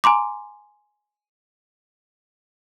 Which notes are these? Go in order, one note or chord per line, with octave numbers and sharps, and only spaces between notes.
G#5 A#5 C6 D6